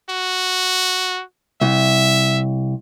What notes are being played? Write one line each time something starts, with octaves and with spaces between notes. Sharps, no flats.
F#4
C2 E5